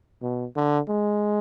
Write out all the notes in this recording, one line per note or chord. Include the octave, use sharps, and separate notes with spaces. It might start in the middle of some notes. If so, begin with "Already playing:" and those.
B2
D3
G#3